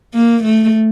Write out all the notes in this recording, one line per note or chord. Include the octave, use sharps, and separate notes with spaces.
A#3
A3